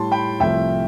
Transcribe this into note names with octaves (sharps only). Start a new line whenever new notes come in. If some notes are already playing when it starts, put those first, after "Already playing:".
Already playing: A2 G3 A5 C6
G5 B5
C2 C3 F3 A3 E5 G5